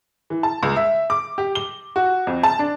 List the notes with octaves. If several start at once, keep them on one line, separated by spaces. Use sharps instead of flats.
E3
A5
C#2
E5
D6
G4
G7
F#4
F2
A5
D4